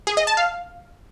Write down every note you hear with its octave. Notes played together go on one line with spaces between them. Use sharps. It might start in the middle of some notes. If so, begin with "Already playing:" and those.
G#4
D#5
A5
F5